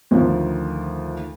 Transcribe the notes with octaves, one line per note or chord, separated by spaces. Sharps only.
D2 D#3 F3